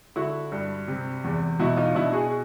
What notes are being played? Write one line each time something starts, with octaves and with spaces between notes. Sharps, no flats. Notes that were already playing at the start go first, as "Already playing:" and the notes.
D3 E4 F#4
G2
C3
E2
B2 E4 F#4
D#4 F4
B2 D4 E4
F#4 G#4